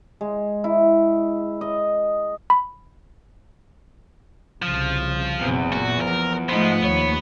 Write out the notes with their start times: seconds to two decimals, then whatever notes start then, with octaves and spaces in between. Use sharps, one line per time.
0.21 G#3
0.64 E4
1.61 D#5
2.50 B5
4.62 C2 C#3 F3
5.41 F#1 E2 B2 C4
5.72 A#2 F#4
6.01 F3 A#4
6.49 G#2 F3 A3 B3 D#4 C5
6.84 D#2 C#5